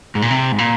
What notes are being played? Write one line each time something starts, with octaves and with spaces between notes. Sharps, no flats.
G#2
A#2
C3
G#2
A#2